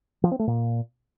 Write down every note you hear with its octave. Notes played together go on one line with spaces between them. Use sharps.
F3
C4
A3
A#2